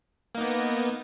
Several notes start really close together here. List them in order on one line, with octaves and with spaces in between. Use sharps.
A#3 D#4 B3